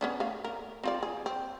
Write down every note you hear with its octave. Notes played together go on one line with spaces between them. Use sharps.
B3 C#4 D4
A3 F5
A#4
C4 F4 D5
G#4
C4